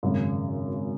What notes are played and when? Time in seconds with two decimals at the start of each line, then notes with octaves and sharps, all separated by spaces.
0.03 G#1 F#2 C#3